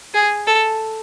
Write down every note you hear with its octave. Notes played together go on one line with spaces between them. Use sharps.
G#4
A4